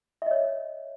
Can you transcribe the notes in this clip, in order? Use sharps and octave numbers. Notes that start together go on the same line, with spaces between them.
C#5 D#5 E5